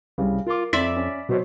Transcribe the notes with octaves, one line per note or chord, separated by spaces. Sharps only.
C2 C#3 G3
F4 A#4 D6
F2 D5 E5 B5 C6 E6 B6
C#4
B2 F#3 C5 C#5